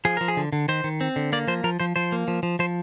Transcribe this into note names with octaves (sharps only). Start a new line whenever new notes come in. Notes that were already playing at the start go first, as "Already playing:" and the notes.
F3 G#4
F3 A#4
G#4
D3
D3
D#3 C5
D#3
C4
D3
A#3 D5
F3 C5
F3 A#4
F3 C5
F3 C5
A#3
F3
F3
F3 C5